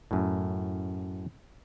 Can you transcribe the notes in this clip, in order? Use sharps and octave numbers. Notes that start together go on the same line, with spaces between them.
F#2 A2